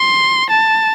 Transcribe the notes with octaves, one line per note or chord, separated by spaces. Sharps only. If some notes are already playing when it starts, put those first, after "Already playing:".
Already playing: C6
A5